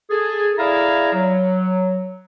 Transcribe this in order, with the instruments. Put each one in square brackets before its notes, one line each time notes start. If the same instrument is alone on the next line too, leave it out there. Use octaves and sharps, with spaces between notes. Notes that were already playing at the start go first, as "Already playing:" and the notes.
[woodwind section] G#4 A4
E4 G#4 D5 E5 F5 A#5
F#3